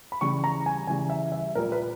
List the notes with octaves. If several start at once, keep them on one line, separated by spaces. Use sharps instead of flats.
B5
C#3 E3 G3 C#6
A#5
G#5
C#3 E3 G3 G#5
E5
E5
A#2 G3 A#4
B4